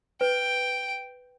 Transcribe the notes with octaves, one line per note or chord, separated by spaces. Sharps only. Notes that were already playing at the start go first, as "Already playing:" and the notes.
B4 G5